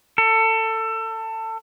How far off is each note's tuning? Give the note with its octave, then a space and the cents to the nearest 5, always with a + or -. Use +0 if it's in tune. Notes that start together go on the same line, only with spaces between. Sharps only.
A4 +25